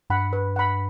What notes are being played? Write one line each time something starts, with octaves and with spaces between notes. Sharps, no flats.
G2 F#5 B5
B4
F#5 B5